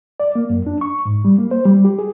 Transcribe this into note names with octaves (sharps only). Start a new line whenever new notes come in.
D5
A#3
F#2
D4
C#6
G#2
G3
A#3
C5
G3
G4
G#4